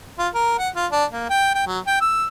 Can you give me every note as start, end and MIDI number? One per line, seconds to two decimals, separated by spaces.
0.18 0.28 65
0.34 0.57 70
0.59 0.69 78
0.76 0.86 65
0.92 1.04 62
1.11 1.29 58
1.29 1.52 79
1.54 1.64 79
1.67 1.79 54
1.87 1.98 79
2.01 2.27 88